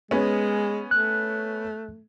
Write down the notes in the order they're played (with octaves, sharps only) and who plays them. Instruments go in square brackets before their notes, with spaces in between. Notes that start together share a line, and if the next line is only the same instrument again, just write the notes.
[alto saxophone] G#3 [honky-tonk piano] B3 C#4
[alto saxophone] A3 [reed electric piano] F#6